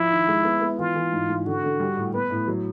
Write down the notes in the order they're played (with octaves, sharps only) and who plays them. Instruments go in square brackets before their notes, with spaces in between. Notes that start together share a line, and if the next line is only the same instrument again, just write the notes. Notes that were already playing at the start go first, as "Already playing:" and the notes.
Already playing: [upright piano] F3 [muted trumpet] E4
[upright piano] D#3
G#3
B3
B3
[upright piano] E3 [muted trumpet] F4
[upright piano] E3
G#2
G#2
[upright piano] D3 [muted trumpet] F#4
[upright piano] D3
G3
A2
[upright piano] B3 [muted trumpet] B4
[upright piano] A2
F#3